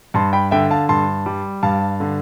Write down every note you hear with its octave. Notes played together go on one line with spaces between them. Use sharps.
G2 A5 C6
G5 B5
D3 E5 G5
F5 A5
G2 A5 C6
G3
G2 F5 A5
D3